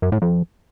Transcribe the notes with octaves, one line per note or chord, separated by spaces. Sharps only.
F#2
A2
F2